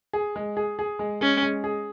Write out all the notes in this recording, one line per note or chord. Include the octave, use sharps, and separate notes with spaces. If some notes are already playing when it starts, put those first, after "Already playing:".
G#4
G#3
G#4
G#4
G#3
G#3 C#4
G#3
G#4